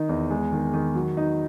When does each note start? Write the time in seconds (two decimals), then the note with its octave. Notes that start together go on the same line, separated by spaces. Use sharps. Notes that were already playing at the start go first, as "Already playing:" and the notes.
Already playing: D#3 D#4
0.09 E2
0.30 G#3
0.52 D#3
0.74 D#3
0.95 F#3
1.17 D#4